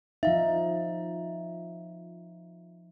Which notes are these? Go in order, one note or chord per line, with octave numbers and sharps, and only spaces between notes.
F3 D#4 E5 F5